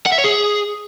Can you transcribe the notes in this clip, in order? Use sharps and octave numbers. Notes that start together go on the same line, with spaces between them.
F#5
E5
C#5
G#4